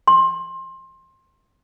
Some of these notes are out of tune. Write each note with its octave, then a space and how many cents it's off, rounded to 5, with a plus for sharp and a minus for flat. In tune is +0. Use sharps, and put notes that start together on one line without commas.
C6 +25